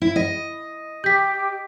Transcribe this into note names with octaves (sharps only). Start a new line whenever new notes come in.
E4
D#5
G4 G6 B6